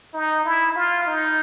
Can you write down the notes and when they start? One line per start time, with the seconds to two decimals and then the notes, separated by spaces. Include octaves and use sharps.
0.14 D#4
0.45 E4
0.75 F4
1.07 D#4